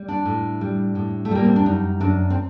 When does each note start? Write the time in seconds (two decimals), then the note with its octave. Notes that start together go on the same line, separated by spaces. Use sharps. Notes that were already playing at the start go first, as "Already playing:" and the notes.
Already playing: G3
0.08 D4
0.25 A2
0.61 G3
0.95 A2
1.25 A3
1.31 G3 A#3
1.45 C4
1.56 D4
1.66 F#2 D#4
2.00 F#2 D4
2.30 C4